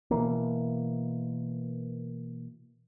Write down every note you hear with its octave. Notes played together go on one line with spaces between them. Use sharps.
B2 E3 A#3